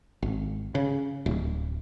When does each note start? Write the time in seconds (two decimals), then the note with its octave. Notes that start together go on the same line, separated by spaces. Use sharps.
0.22 G#1
0.75 C#3
1.26 D1